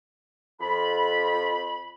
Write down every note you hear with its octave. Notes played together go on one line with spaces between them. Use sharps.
F2 B5